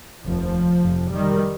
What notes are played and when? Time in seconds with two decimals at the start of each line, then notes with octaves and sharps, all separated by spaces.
0.25 F1 D#2 F3
0.82 F1 F2 C3
1.10 D#3 G3